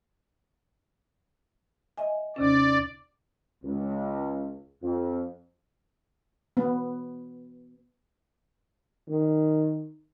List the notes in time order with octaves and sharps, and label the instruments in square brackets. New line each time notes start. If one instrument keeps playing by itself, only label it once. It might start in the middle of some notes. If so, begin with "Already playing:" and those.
[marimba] D#5 E5 G#5
[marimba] D#2 C3 C#4 [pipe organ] D5
[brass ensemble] C#2
F2
[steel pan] B3
[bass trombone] D#3